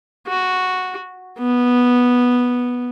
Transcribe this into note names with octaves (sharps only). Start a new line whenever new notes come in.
F#4
B3